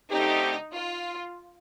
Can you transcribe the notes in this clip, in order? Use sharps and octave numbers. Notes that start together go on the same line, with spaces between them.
D3 A3 C4 D#4 G4
F4